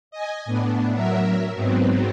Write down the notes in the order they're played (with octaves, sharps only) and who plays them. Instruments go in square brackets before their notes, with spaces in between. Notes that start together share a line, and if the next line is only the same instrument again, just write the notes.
[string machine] D#5 G#5
A2 B3 D4
F#3 A#4 E5
G#2 F#3 B3 C4